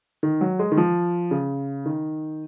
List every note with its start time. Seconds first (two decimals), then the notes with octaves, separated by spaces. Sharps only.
0.23 D#3
0.41 F#3
0.59 G#3
0.72 D#3
0.77 F3
1.31 C#3
1.85 D#3